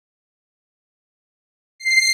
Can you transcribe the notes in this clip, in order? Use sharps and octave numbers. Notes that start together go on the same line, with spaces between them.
C7